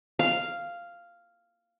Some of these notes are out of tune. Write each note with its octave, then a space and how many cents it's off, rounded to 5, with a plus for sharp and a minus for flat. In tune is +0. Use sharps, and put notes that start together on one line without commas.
F5 -5